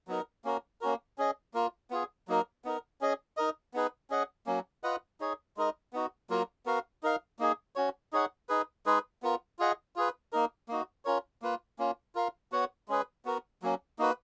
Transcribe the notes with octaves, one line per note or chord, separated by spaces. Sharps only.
F#3 B3 D#4 A#4
A#3 C#4 F#4 A#4
A#3 C#4 F#4 A#4
C#4 G#4 D#5
A#3 F4 A#4
B3 F4 G#4
F#3 A#3 D#4 A#4
B3 D#4 A#4
C#4 G#4 D#5
D#4 A#4 D#5
B3 D#4 G#4 B4
C#4 G#4 D#5 F#5
F#3 A#3 C#4
F4 B4 D#5 F#5
D#4 G#4 C#5
G#3 D#4 A#4 D#5
B3 D#4 F#4
F#3 A#3 F4 A#4
B3 F#4 A#4 F5
D#4 A#4 F5
A#3 D#4 G#4
C#4 F#4 C#5
D#4 G#4 C#5 F#5
D#4 G#4 B4
G#3 D#4 G#4 B4
B3 F4 A#4
F4 G#4 D#5 F#5
F4 G#4 B4
A#3 D#4 A#4
A#3 D#4 F#4
C#4 F4 A#4 C#5
A#3 F4 B4
A#3 C#4 F4
F4 A#4 F5
B3 F#4 C#5 F#5
G#3 C#4 G#4 B4
B3 F#4 A#4
F#3 A#3 C#4
A#3 D#4 F#4 B4